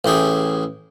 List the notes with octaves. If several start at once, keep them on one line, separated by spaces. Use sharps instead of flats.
A1 A2 G4 G#4